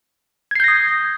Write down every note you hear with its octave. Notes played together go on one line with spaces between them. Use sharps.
D#6 G6 G#6 A#6 C7